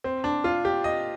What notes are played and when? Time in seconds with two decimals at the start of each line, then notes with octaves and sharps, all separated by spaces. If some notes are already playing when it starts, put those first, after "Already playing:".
0.04 C4
0.24 D4
0.44 F4
0.65 G4
0.84 D#5